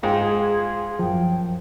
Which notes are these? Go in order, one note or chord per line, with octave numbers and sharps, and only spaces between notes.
G#2 F4 G5
G#4
F#2 F3 G5